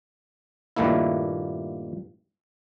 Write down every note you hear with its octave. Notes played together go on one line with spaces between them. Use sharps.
G2 A#2 D#3 A3 A#3 E4